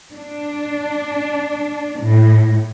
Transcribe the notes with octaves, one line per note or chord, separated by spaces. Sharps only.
D4
A2